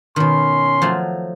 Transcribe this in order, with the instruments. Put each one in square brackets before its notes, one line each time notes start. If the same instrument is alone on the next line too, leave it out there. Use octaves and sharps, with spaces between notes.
[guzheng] B2 D#3 [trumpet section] C#4 C6
[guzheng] F3 F#3 A3